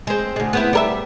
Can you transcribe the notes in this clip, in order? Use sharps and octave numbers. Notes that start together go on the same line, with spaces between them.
G#3 C4
D2 G#3
B3 C4 E4
G3 A#4 E5